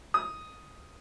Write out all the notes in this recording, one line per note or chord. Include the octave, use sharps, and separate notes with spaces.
D#6